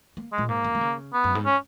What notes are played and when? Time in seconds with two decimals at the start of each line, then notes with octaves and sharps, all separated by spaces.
0.17 A#3
0.32 G#3
0.38 A#2
0.49 G#2 A#3
0.64 F#2
0.75 D#3
0.81 C#3
1.13 B3
1.24 F#2
1.35 G#2
1.46 C#4